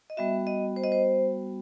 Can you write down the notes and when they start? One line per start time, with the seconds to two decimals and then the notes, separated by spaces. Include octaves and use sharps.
0.10 D#5
0.17 G3 B3 F#4 E5
0.47 D#5
0.76 C5
0.84 D#5
0.92 C5